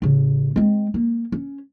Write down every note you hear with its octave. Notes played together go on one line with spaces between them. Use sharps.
A1 C#3
G#3 C4
A#3
C#4